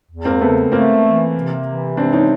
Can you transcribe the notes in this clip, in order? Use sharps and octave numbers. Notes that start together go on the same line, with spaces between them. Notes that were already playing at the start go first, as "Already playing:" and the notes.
E2
A#3 C4
C#3 A3 B3
A3 A#3 C4
E3
C3
E3
C3 C4 D4
C#4 D#4